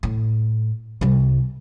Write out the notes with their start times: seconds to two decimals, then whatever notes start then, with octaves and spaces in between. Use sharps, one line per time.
0.03 A2
1.01 C2 G3